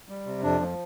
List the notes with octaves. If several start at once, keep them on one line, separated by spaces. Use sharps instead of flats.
G3
C3
F2 D4
F3